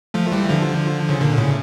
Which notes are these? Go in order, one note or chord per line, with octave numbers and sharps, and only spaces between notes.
F3 A3
E3 G3
D3 F3
C#3
A#2 D3
A2 C#3